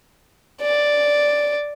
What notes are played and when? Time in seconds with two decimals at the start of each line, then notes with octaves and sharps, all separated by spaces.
0.62 D5